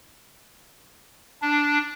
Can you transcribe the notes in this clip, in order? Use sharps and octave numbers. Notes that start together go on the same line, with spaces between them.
D4